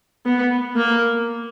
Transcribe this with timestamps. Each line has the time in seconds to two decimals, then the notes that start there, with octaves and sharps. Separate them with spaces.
0.26 B3
0.76 A#3